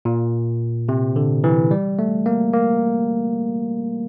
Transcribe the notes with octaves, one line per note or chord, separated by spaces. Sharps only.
A#2
C3
D3
E3
G3
A3
A#3
A#3